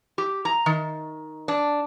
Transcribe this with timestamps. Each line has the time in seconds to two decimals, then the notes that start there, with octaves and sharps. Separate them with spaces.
0.18 G4
0.45 A#5
0.66 D#3
1.48 D4